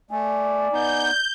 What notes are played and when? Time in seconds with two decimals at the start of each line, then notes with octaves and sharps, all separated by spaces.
0.11 A3 D5 G#5
0.72 B3 D#4 G6